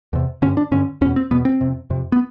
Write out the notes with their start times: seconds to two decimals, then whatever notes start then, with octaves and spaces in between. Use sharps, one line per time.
0.13 E2 C3
0.42 G2 D3 C#4
0.57 D4
0.71 G2 D3 C#4
1.01 E2 B2 C#4
1.16 C4
1.31 E2 B2 B3
1.45 C4
1.61 F2 C3
1.90 F2 C3
2.12 B3